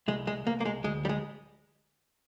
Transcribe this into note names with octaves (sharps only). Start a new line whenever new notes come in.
C2 G#3
G#3
C2 A#3
A#3
G#3
D2 G#3
G3
G#3